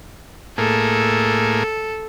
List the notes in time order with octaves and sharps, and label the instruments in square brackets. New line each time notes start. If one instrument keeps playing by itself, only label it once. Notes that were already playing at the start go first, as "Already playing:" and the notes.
[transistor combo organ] A2 A#3 G#4 [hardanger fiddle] A4